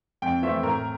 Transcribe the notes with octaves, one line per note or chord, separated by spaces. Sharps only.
F2 G5
E3 A3 C4 E5
A2 A#4